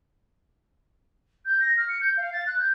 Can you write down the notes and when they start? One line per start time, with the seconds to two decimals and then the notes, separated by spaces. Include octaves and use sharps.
1.45 G6
1.60 A#6
1.77 F6
1.89 C#7
2.01 G6
2.17 F5
2.33 A6
2.47 F#6
2.59 G6